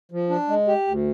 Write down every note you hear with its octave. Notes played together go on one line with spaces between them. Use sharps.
F3
D4
G#3
G4
D2